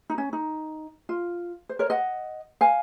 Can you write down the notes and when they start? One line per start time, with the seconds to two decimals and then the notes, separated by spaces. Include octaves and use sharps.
0.10 D#4
0.18 C#4
0.33 D#4
1.09 F4
1.69 C5
1.79 A#4 C#5
1.90 D#5 F#5
2.61 F5 G#5